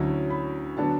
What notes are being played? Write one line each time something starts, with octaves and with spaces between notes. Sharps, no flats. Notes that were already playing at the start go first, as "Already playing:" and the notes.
Already playing: D2 D3 F#3 C#4 E4
B5
D3 F#3 B3 D4 A5